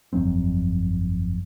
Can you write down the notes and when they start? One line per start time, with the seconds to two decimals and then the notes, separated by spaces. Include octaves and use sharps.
0.13 G1 F2 F#3 C4